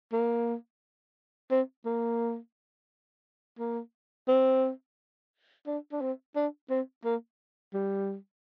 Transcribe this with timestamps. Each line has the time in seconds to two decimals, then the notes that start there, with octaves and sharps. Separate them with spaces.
0.13 A#3
1.51 C4
1.86 A#3
3.59 A#3
4.28 C4
5.67 D4
5.92 D4
6.01 C4
6.36 D4
6.70 C4
7.05 A#3
7.74 G3